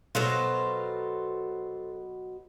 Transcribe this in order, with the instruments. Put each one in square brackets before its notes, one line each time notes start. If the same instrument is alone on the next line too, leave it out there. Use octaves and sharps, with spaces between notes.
[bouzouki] B2 F#3 F4 [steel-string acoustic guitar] A4 C5